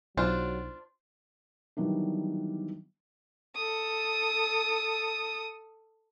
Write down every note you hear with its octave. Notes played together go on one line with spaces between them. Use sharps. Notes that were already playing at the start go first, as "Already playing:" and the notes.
B1 F#3 D4 F4 C5
D#3 E3 F#3 G3 B3 D4
A4 D#6